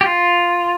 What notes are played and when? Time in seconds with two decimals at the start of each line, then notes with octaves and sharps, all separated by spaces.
0.01 G4
0.06 F4